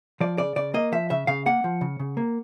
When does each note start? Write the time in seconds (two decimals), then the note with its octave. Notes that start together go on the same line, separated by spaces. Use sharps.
0.21 F3 D5
0.38 C#3 D5
0.56 C#3 D5
0.74 A#3 D#5
0.92 F3 E5
1.10 C#3 E5
1.27 C#3 F5
1.46 A#3 F#5
1.64 F3
1.81 C#3
2.00 C#3
2.17 A#3